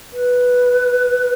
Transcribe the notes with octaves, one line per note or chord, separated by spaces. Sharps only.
B4